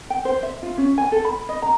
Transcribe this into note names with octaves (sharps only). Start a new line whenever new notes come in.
G5
C5
E5
F4
C#4
G#5
A4
B5
D#5
A#5